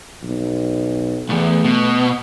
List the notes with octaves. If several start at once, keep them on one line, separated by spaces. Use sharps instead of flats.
B1
B1 E2 A3
B2